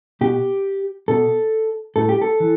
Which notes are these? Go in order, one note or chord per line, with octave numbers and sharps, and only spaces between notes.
B2 G4
B2 A4
A2 A4
G4
A4
E3